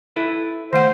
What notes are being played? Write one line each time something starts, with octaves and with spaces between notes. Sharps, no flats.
E4 A4 B4
D#3 A3 C5 F#5